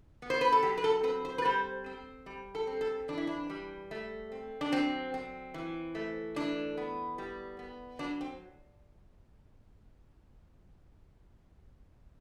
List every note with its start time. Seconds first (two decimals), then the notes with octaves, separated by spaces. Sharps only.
0.22 B3
0.30 C5
0.41 B4
0.52 A4
0.63 F#3 G4
0.77 B4
0.84 A4
1.03 C4 B4
1.25 C5
1.38 B4
1.45 G3 C5
1.86 C4
2.26 G3
2.55 A4
2.67 C4
2.81 A4
3.08 E3 D4
3.18 E4
3.27 D4
3.50 G3
3.91 A3
4.32 C4
4.61 D4
4.72 F#3 C4
5.14 C4
5.54 E3
5.95 A3
6.36 E3 D4
6.77 B3
7.18 G3
7.59 B3
7.99 F#3 D4
8.21 C4